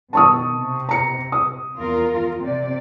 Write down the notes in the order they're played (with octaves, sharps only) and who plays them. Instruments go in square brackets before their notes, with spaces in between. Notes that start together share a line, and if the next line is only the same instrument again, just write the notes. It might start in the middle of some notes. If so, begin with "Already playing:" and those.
[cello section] B2 D#3 [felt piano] A5 C#6 D#6
[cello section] C3
[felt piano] A#5 C#7
D#6
[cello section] E2 F4 A#4
C3 D5